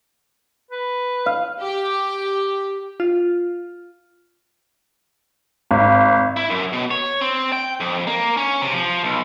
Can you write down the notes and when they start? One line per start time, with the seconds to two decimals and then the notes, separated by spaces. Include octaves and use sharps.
0.71 B4
1.26 F5
1.61 G4
3.00 F4
5.71 G#1
6.37 E4
6.50 F#2
6.73 B2
6.91 C#5
7.21 C4
7.52 G5
7.80 F2
8.07 A#3
8.37 C#4
8.61 C3
8.73 F3
9.03 B1